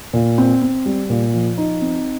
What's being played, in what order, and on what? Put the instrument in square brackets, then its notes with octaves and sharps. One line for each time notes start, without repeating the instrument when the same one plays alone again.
[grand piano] A#2
C4
C4
G3
A#2
F3
D#4
C4